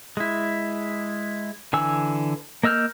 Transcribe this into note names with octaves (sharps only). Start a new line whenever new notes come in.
G#3 E4
D3 E3 G#5 E6
A#3 D#5 E6 F6 G6